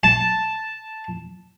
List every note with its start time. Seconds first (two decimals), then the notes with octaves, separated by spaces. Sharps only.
0.03 A5